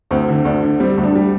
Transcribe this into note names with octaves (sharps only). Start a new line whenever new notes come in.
D2 C4
D3
D2 D4
D3
G3 C4
D2
D4
G3